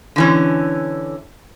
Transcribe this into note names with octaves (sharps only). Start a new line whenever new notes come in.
D3 E3 C#4